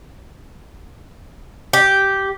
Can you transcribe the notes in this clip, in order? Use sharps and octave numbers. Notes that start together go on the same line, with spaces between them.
G4